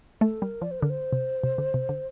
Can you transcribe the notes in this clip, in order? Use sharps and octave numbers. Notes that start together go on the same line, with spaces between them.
A3 A4
G3 A#4
F3 D5
C5
D3 A#4
C5
C3
C3
D3
C3
D3